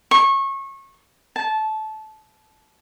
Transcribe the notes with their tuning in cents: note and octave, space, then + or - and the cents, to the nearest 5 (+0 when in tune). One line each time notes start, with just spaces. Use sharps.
C#6 -25
A5 -20